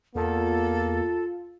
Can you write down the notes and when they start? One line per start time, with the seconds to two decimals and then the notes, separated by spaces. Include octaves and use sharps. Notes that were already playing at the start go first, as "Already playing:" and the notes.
0.15 E2 A#3 F4 A4